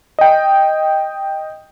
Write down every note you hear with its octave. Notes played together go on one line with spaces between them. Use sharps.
D#5 G5